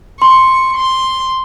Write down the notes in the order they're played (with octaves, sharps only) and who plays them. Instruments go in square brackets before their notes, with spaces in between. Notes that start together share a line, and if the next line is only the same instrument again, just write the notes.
[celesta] C6 [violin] C#6
[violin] C6